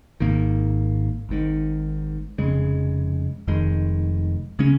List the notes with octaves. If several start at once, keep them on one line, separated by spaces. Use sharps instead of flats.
G#1 G#2 D#3 A#3
G#1 G#2 D#3
F1 F2 C#3 G#3
F1 F2 D#3 G#3
C#3 G#3 C#4